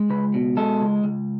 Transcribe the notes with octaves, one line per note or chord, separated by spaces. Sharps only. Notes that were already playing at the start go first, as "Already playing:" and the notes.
Already playing: G#3
C#2 B4
B2
G#3 A4
C#2
C#2